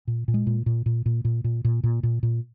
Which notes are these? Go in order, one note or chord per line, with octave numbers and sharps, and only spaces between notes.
A#2
A#2
G#3
A#2
A#2
A#2
A#2
A#2
A#2
A#2
A#2
A#2
A#2